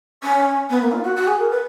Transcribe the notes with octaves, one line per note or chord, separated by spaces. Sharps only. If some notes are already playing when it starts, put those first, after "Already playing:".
C#4
B3
A#3
F4
F#4
F#4
G#4
A#4
B4